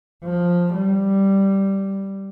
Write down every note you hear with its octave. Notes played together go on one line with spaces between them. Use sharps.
F3
G3